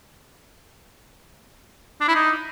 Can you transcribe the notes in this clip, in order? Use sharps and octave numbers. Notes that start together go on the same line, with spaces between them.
D4
E4
D#4